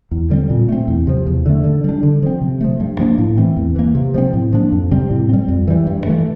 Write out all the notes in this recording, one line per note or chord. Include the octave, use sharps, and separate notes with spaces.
E2
D3 G3 C4
A#2
A3 C4
E2
C3 F3
E2
D3 A3
D3
G3 D4
D3
F3 C4
C3
F3 A3
G2
F3 A#3 D4
A2
E3 A3 C4
E2
E3 A#3
C3
F3 A3 C4
A2
F3 A#3 D4
F2
C3 G3 C4
A2
G3 C4
F2
E3 G3
G2
E3 A3